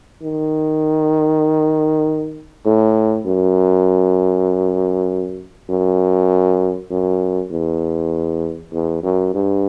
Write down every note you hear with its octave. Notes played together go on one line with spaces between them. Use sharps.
D#3
A2
F#2
F#2
F#2
E2
E2
F#2
G2